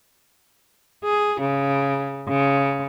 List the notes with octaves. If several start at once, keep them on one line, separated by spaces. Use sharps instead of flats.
G#4
C#3
C#3